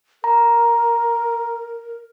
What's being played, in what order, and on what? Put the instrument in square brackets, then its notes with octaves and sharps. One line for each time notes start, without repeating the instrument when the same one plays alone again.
[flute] A#4 [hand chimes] A#5